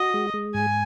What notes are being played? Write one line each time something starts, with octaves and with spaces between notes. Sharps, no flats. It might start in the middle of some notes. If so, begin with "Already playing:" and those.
Already playing: F#4 D#5
G#3
G#3
G#2 G#5